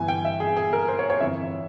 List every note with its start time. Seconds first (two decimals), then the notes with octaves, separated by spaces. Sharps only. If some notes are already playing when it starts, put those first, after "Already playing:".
Already playing: G1 G2 E3 G#5
0.08 G5
0.25 E5
0.40 G#4
0.57 G#4
0.73 A#4
0.88 C5
0.99 C#5
1.10 C#5
1.20 G1 F2 E3 E5